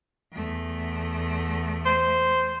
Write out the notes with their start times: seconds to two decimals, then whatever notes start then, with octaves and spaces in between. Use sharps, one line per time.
0.32 E2 A3
1.86 C5